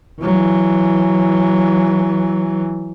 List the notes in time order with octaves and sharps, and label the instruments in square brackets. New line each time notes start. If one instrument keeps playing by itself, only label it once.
[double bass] E3 F#3